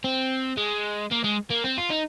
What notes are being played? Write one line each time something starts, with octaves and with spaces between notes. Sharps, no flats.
C4
G#3
A#3
G#3
A#3
C4
F4
D#4